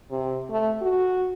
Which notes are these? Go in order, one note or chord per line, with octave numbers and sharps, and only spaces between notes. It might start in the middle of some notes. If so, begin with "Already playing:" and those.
C3
A3
F#4